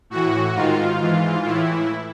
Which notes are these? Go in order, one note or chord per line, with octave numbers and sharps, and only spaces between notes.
A2 E3 F#4
G#2 D#3 F4
G#2 E3
A2 E3 E4